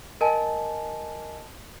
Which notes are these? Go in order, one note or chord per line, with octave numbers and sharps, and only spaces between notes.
A#4 D#5 G#5 A5